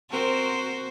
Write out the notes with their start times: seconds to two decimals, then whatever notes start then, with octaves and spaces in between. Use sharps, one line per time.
0.11 C4 F#4 A#4 C5